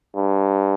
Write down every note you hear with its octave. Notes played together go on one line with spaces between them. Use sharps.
G2